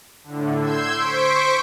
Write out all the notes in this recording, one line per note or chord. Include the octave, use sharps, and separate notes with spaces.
A2 D3
C6 E6 G6 G#6
C5 C#6 B6 D7